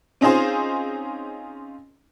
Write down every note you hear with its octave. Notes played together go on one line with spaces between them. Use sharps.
C4 C#4 D#4 F4 G#4 C5